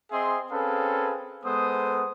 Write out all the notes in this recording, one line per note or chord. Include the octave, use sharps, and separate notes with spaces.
C4 G#4 D#5 E5 C6
C4 C#4 G#4 A4 B4 F5
G#3 B3 A4 C5 D#6